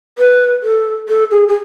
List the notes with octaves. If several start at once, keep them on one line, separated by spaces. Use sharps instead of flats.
B4
A4
A4
G#4
G#4